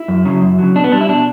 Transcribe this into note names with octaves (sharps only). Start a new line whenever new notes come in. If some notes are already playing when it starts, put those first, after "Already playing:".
Already playing: E4
F#2
C#3 F#3
F#2
C#3 F#3
B2 D4
B3
G3 D4
E4
B2 D4